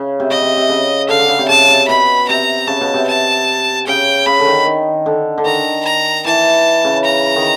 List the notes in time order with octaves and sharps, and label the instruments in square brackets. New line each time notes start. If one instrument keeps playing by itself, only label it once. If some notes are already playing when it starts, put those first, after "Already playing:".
Already playing: [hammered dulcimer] C#3
C3
[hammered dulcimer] C#3 [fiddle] D#5
[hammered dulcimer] C3
C3
C#3
[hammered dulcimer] D3 [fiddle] F5
[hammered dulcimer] D3
C#3
C3
[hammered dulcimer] C#3 [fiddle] A5
[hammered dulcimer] C3
[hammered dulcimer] B2 [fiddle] B5
[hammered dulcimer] C3 [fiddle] A#5
[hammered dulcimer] C#3 [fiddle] A5
[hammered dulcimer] B2
C3
[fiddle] A5
[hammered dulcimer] C#3 [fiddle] G5
[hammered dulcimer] C#3 [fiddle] B5
[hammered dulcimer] D3
D#3
D#3
D3
D3
[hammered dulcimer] D#3 [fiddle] A#5
[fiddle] A#5
[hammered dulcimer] E3 [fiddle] A5
[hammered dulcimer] C#3
[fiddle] A#5
[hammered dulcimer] D#3